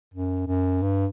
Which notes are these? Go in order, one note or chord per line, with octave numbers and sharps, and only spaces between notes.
F#2
F#2
G2